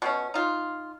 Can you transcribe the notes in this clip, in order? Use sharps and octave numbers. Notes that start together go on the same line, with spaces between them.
B2 A3 C#4
D#4 F4